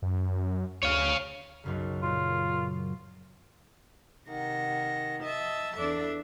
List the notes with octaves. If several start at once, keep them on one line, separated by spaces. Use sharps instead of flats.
F#2
D2 C#5 F5
B1 F#2 C#3
A#2 F#3 F4
C3 D#3 F#5 A#6
D#5 E5 A5
E2 D4 A4 E5